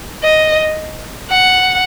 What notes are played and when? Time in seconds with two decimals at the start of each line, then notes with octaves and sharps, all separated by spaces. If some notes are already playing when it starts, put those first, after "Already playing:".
0.24 D#5
1.30 F#5